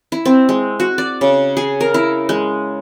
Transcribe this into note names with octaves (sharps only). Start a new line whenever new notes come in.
E4
C4
G#3
F#4
D5
C#3
G#4
A#4
E4
G#3